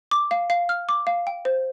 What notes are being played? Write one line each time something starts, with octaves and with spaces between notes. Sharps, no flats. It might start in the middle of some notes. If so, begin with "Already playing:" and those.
D6
F5
F5
F6
D6
F5
G5
C5